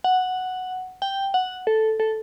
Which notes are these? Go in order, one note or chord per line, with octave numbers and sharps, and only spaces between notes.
F#5
G5
F#5
A4
A4